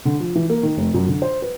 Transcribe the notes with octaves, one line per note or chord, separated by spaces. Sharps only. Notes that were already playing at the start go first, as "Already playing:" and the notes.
D3
F3
E3
A#3
D#3
F1
F#2
D3
C5
B4